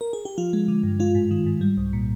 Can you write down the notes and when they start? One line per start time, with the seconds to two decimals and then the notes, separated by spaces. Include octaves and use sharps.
0.01 A#4
0.13 G#4
0.25 G4
0.38 F3 F4
0.53 G#3
0.68 D3
0.83 G2
0.99 G#3 F4
1.15 G#2
1.31 D#3
1.46 G#2
1.61 G3
1.77 C2
1.93 A#2